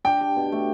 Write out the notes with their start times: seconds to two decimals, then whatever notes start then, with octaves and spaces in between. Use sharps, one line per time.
0.04 D4 G5
0.21 G4
0.36 B2
0.52 A3